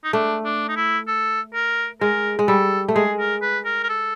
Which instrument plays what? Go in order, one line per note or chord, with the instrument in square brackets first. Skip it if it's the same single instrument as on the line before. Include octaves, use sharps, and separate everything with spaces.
[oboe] D#4
[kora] A3 [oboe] D4
[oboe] D4
D#4
E4
A4
A#4
[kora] G#3 [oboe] A#4
[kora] G#3
[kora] G3 [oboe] A4
[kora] A3
[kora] G#3 [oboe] G#4
[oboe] A#4
B4
A#4
A#4
A4